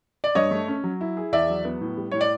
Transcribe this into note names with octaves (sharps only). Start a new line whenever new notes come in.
D5
G2 C#5 D#5
A3
C#4
F#3
E4
G#4
E2 D5 E5
F#3
B3
A2
G3
A2 C#5
D5